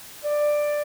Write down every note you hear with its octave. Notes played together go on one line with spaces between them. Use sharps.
D5